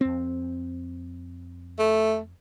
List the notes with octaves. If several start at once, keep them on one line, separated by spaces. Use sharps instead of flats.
F2 C4
A3